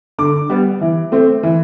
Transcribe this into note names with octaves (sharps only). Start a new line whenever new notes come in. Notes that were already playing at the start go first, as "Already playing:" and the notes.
D3 D6
G3 B3
E3
A3 C4
E3